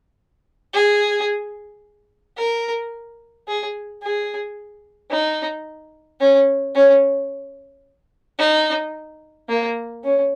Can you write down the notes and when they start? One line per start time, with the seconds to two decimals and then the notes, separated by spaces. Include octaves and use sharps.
0.74 G#4
2.37 A#4
3.48 G#4
4.03 G#4
5.11 D#4
6.20 C#4
6.75 C#4
8.39 D#4
9.49 A#3
10.03 C#4